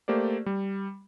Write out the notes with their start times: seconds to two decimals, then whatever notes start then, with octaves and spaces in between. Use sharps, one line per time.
0.08 A3 A#3 G4 C5 D5
0.46 G3